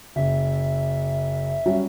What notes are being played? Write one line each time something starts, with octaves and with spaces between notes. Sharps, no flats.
F#1 E5
F#3 G3 C#4